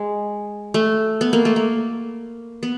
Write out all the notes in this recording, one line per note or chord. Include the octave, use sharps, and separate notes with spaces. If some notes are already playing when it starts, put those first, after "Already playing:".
Already playing: G#3
A3
B3
A#3
A3
A#3
B3